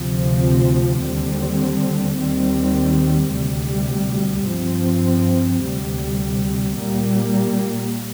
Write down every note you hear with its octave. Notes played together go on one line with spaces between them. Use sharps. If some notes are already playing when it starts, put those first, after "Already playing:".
Already playing: D2 C3 F3 C4
D#2 D3 G3 C4
D#2 D#3 G3 C4
D2 C3 G3
G2 F3 C4
D2 C3 G3
A#2 G3 A#3